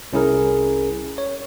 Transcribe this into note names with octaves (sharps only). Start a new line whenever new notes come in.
C2 C#4 E4 G#4 A#4
C#5